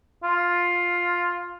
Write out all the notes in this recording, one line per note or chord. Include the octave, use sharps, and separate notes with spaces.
F4